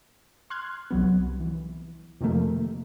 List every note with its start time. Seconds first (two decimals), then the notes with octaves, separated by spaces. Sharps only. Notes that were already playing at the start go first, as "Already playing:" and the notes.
0.50 C6 F6 F#6 G#6
0.91 C2 F#3 B3
1.40 E3
2.21 F2 C3 D#3 F3 A3 A#3